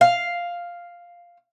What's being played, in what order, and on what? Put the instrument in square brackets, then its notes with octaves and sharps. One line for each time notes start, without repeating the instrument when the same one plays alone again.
[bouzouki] F5